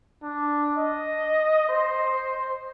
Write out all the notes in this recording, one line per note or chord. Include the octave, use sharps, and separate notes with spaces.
D4
D#5
C5